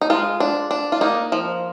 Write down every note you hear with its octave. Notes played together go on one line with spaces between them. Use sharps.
D#4
G#3 F4
D4
D4
F4
A#3 D#4
F3